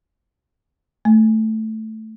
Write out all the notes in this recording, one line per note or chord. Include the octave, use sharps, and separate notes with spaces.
A3